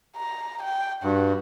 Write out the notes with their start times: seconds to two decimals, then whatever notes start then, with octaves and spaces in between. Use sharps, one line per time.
0.16 A#5
0.63 G5
1.03 G2 F#4